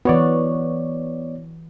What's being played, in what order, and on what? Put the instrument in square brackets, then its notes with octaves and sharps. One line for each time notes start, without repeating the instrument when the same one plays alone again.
[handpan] E3 F#4 [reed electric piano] B3 C#5 D5